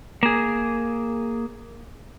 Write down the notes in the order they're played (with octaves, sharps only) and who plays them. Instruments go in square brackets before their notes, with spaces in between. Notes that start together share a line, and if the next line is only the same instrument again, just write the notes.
[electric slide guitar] A#3 G#4